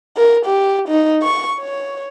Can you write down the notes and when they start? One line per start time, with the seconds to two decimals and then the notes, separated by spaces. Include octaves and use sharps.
0.17 A#4
0.45 G4
0.88 D#4
1.23 C#6
1.60 C#5